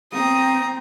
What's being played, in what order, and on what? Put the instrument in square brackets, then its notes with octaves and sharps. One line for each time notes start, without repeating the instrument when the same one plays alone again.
[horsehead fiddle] C4 [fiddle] A#5 D#6